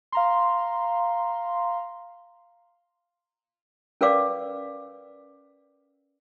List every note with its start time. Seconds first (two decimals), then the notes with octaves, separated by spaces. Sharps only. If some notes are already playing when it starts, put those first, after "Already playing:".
0.12 F5 A#5 C6
4.01 C#4 A#4 B4 D5 F5 D6